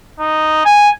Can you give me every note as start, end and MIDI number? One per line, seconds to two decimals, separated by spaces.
0.20 0.64 63
0.65 0.90 80